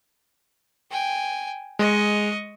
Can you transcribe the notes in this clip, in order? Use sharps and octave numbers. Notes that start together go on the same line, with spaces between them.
G5 G#5
G#3 D#5 C#6